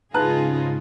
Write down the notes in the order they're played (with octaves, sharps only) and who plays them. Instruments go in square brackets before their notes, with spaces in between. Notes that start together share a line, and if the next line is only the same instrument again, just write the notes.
[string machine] G#2 C#3 [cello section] D#4 F4 G#4 [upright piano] B4 A5 F#6